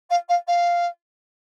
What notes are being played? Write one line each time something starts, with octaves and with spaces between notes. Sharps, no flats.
F5
F5
F5